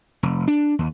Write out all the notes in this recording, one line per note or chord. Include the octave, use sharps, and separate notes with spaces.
F1
D4
D#2